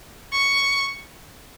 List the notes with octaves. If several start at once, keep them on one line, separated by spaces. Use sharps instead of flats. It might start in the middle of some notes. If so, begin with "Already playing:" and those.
C#6